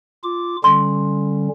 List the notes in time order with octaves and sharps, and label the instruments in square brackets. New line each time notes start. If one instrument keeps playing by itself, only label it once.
[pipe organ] F4 D6
[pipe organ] D3 G3 C#4 [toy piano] C6